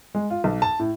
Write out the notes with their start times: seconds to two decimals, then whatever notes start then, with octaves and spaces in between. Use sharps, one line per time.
0.15 G#3
0.30 F4
0.44 B1
0.62 A5
0.80 A2